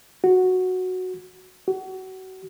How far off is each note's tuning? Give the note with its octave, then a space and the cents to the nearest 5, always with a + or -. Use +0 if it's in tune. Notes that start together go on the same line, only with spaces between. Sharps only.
F#4 -5
F#4 +30